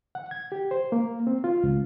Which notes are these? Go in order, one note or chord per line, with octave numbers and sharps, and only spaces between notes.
F#5
G#6
G4
C5
A#3
C4
F4
C#2